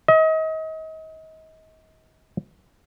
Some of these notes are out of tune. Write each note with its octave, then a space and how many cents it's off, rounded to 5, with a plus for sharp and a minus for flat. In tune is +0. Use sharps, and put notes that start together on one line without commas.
D#5 +35